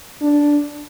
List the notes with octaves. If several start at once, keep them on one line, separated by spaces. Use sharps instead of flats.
D4